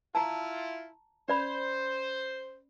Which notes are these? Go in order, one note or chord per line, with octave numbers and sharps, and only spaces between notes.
E4 F4 A5 A#5
C#4 C5 D5 B5